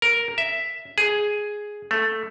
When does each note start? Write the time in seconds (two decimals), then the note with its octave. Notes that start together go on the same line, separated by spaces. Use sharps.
0.02 A#4
0.38 E5
0.98 G#4
1.91 A3